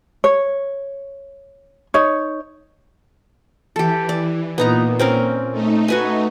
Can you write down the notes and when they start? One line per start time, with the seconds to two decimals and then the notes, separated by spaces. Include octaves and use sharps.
0.24 C#5
1.94 D#4 C#5
3.76 E3 G4 A4
4.09 D5
4.58 A#2 B3 D#4 A#5
4.99 C4 C#4 A#4
5.52 A3 D#4
5.88 F#4 B4 G#5